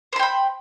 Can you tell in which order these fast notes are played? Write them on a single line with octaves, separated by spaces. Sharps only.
C5 C6 G5 B5